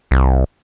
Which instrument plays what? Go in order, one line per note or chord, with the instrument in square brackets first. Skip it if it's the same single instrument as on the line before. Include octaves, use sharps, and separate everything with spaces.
[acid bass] C2